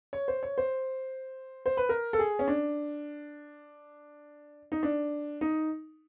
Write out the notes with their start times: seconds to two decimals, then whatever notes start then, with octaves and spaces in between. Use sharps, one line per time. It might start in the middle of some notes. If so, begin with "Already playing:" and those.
0.13 C#5
0.28 C5
0.43 C#5
0.58 C5
1.66 C5
1.77 B4
1.89 A#4
2.13 A4
2.19 G#4
2.39 C#4
2.48 D4
4.72 D#4
4.83 D4
5.41 D#4